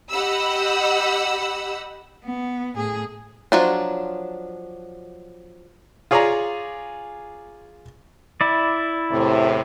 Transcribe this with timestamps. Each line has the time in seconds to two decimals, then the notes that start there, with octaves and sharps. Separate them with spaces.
0.12 G4 D#5 F#5 B5 E6
2.24 B3
2.75 A2 G#4
3.52 F3 F#3 D4
6.11 F4 G#4 C#5 D5 G#5 A#5
8.41 E4 D5
9.11 E2 A2 C3